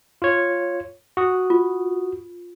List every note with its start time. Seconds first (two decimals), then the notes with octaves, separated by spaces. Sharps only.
0.22 F4 C#5
1.17 F#4 D#6
1.50 F4